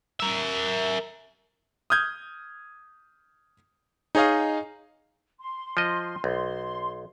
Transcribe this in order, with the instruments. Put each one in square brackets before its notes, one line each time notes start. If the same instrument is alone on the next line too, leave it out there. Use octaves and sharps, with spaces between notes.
[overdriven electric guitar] A#4 E5
[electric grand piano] D#6 F6 G6 G#6
D#4 G#4 C#5 D#5 F5
[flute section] C6
[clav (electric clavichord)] F3 D#5
[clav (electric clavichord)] B1 [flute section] C6